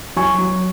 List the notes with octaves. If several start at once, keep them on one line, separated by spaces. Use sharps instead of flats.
F#3 G#5 C#6
F#3